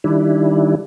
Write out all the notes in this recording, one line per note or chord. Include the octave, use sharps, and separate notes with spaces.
D#3 G3 D4 E4